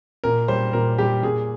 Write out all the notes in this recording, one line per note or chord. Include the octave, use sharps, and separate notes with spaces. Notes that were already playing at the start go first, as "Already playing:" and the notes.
A#2 A#4
G3 C5
A#2 A#4
G3 G4
A#2 G#4